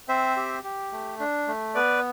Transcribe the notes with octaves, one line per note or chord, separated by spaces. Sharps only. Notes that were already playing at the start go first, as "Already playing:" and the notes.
C4 C5 E5
G4
G4
A3
D4
A3
B3 B4 D5